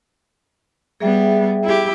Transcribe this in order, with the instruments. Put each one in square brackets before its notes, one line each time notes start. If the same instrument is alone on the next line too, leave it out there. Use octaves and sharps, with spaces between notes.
[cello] G3 B3 [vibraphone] G#4 E5 G5
[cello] E4 G4